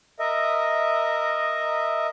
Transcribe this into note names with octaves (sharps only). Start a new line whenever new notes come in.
A#4 D#5 E5